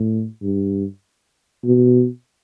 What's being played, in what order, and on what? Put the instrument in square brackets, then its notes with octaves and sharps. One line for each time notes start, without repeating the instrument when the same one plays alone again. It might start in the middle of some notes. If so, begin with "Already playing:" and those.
Already playing: [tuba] A2
G2
B2